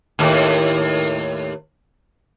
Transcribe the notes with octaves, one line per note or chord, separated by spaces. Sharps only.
D#2 A2